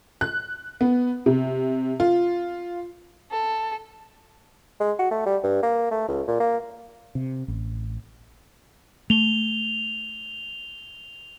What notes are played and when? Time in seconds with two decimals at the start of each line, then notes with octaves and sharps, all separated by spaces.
0.21 F#6
0.81 B3
1.26 C3
2.00 F4
3.31 A4
4.80 G#3
4.99 F#4
5.11 A3
5.26 G3
5.44 G2
5.63 A#3
5.91 A3
6.08 C#2
6.28 A#2
6.40 A#3
7.15 C3
7.48 A1
9.10 A3 F7 G7